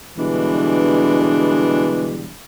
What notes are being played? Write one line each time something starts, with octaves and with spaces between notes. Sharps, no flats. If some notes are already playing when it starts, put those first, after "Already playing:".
B2 D3 E3 G3 G#3 D4